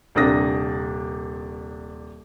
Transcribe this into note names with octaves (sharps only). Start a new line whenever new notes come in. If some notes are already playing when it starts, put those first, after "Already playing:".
D#1 C3 D4 A#4 D#6 A#6